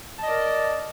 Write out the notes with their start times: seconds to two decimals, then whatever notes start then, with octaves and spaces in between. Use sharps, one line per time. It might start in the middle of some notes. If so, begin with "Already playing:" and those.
0.19 A5
0.22 D#5
0.25 D5
0.29 A#4